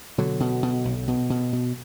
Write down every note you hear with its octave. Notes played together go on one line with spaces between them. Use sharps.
B2 D3 F#3
B2
B2
B1
B2
B2
B2